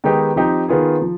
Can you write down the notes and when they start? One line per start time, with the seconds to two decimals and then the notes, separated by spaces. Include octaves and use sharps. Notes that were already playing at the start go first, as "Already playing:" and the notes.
0.04 D#3 G#3 B3 D#4 G4
0.36 F3 C4 D#4 G4
0.68 D#3 B3 F4 G#4
1.02 F3